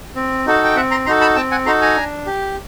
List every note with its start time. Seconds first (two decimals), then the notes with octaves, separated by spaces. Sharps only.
0.16 C4
0.46 D#4 F#4 A4
0.64 G5
0.76 C4 E5 F#5
0.91 A#5 C6
1.06 D#4 F#4 A4 A#5 C6
1.21 A5 B5
1.36 C4 G5 A5
1.51 F#5 G#5
1.66 D#4 F#4 A4 A#5 C6
1.81 G#5 A#5
1.97 D4
2.26 G4